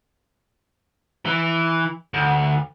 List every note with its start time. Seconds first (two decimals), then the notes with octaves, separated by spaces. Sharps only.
1.26 E3
2.14 D2